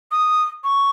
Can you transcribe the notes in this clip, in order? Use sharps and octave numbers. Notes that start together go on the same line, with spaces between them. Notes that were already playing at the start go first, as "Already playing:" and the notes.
D#6
C#6